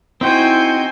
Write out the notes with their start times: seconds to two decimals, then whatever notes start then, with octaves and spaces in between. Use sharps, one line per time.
0.21 C4 D#4 E4 F#4 C5 G5 G#5